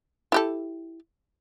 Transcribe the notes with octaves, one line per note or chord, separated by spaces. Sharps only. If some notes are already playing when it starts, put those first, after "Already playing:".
E4 G4 A4